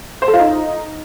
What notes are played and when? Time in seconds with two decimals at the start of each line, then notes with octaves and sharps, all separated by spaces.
0.22 C5
0.28 A4
0.34 F4
0.39 D#4